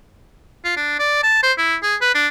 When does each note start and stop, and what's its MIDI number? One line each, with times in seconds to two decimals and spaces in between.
0.65 0.75 65
0.77 0.97 62
1.00 1.19 74
1.23 1.40 81
1.43 1.53 72
1.58 1.76 64
1.83 1.96 68
2.02 2.11 71
2.15 2.28 62